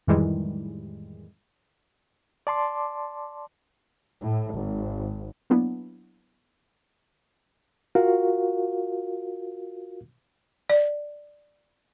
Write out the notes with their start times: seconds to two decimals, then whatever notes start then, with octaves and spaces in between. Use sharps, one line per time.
0.07 F2 A2 D#3 E3 G3 G#3
2.47 D5 A5 C6 D6
4.22 A2
4.54 G#1
5.50 F#3 A#3 B3 D4 E4
7.95 F4 F#4 A#4 F5
10.70 D5